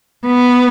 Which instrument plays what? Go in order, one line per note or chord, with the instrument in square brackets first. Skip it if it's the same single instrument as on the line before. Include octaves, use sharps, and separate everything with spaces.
[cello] B3